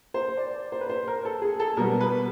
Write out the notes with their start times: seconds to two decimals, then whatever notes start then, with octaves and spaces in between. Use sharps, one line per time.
0.14 C5
0.37 D5
0.72 C5
0.81 B4
0.89 C5
1.08 A#4
1.25 A4
1.42 G#4
1.60 A4
1.77 B2 G3 B3 A#4
2.00 B4